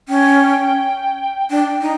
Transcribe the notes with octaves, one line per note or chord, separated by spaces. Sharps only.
C#4 G5
D4 G5
D#4